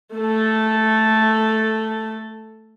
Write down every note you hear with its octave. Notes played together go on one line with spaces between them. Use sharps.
A3 A4